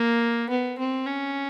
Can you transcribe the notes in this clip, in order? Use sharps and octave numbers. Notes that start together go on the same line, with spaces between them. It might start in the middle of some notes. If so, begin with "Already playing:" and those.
Already playing: A#3
B3
C4
C#4